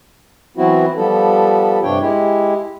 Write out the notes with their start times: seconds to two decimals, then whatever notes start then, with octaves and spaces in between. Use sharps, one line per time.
0.57 E3 F#3 B3 C4 E4 F#4
0.96 F3 G3 B3 A4
1.83 G2 C3 D4 C#5 G5
2.01 G#3 E4 G4